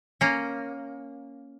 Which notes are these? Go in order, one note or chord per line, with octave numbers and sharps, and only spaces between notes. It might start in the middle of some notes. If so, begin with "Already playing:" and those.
A#3 C#4